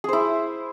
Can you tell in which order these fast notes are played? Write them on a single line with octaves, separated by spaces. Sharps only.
G#4 C5 E4